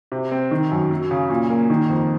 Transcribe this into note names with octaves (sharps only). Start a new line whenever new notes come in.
C3
C4
D#3
F#2
F#3
C#3
A#2
A#3
D#3
F2